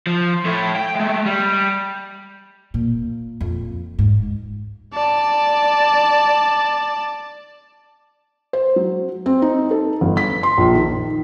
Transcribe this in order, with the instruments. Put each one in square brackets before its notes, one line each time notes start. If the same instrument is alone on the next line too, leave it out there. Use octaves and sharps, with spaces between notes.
[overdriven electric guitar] F3
A3 E4
G5
G#3 A3
G3
[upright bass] A#2
F2
G#2
[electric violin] D5 A5
[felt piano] C5
F#3
C4
D#4
A4
G1
B6
C6
A#1
D#3